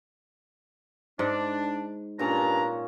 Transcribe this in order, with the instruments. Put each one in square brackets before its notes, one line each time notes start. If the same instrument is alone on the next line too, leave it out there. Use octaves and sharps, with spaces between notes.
[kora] G#2 [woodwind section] D4
[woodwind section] G2 D4 A#5 [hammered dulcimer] A#2 C#4